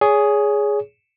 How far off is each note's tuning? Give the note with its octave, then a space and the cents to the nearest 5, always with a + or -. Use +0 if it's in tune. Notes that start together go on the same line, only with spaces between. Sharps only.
G#4 +0 C#5 +30